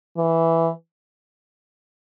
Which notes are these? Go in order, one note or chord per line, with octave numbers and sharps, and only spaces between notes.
E3